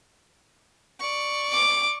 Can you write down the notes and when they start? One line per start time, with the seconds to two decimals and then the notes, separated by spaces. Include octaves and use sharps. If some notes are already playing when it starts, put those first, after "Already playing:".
0.99 D5 C#6
1.53 D6